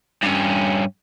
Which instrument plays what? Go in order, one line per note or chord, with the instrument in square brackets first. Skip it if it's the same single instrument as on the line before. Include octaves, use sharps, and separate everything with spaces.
[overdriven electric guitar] G2 C#4